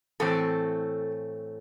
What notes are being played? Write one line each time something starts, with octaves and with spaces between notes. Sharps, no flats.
A2 E3 A3 C4 A4